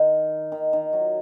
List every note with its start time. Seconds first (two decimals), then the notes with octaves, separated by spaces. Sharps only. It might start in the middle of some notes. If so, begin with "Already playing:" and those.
Already playing: D#3
0.52 D#3
0.73 D#3
0.93 F#3